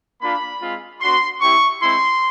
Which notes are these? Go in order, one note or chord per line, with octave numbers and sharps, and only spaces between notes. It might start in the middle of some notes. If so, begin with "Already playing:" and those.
A#3 D4 F4 B5
G#3 C4 F4
B3 D4 F#4 C6
C4 E4 G4 C#6
G#3 C4 E4 C6